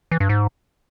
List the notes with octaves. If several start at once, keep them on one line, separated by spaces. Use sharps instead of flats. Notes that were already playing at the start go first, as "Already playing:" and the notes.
E3
G2
G#2